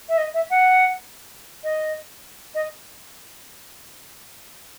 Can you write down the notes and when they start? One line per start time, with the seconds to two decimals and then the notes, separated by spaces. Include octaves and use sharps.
0.09 E5
0.18 D#5
0.34 E5
0.50 F#5
1.64 D#5
2.55 D#5